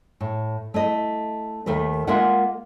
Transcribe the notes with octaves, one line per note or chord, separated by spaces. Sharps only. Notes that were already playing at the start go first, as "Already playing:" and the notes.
A2
A3 E4 D#5
D#2 D#3 A3 A#4 B4
G#3 A#3 F4 A#4 E5 F#5